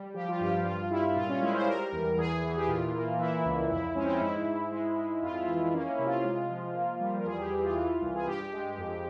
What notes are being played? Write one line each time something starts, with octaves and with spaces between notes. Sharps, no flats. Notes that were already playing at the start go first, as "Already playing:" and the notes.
Already playing: G3
F3 G4
F4
G2 G4
G2 F4
G3 E4
A#2 F4
C#4
G#3 E4
C5
G3 A#4
E2
E2 G#4
E3
G4
A#2 F4
A#3
E3 E4
C#2
F2 E4
G#3 C#4
C4
C#4
G#2 E4
G#2
G#3
G#3
F2 F4
E4
E3 F4
E4
A#3 C#4
E4
C3
F4
G#3
F3
A#3
G3
A#4
E2 G#4
G4
E3
F4
E3
C2
G#4
G2 G4
G#3
F2